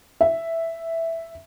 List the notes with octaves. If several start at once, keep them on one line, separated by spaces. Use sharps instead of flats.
E5